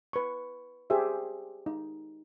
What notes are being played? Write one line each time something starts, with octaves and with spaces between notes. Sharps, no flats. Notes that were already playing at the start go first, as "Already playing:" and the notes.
B4 C#6
G4 G#4 C5 E5
D#4